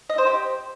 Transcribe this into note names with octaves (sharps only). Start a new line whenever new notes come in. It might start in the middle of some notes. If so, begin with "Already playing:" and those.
D#5
C5
G4